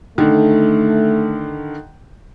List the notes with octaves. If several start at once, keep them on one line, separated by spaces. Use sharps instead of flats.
D3 D#3 A3